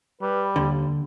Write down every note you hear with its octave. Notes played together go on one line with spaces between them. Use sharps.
G3 B4
D#2 D3